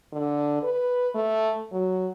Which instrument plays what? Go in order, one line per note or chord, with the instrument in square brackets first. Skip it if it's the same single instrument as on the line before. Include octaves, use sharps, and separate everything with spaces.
[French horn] D3
B4
A3
F#3